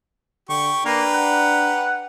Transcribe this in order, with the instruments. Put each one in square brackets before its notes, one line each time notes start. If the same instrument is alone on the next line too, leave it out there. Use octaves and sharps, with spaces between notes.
[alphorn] D3 [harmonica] G4 C#6
[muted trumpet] A#3 [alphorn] D4 [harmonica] G4 B4 A#5
[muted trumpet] F#5